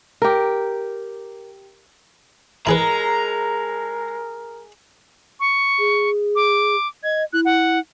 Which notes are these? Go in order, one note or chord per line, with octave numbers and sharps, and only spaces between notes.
G4 A#4
G#3 E4 G#4 A#4 B4 A#5
C#6
G#4
D6
D#5 G#6
E4 F#6
F#5